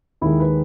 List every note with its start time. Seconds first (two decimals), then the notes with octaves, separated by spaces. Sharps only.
0.21 D#2 D#3 G#3 E4
0.40 B4